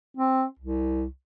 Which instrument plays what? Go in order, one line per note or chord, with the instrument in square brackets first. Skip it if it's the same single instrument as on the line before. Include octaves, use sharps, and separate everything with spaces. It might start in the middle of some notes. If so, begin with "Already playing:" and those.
[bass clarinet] C4
C2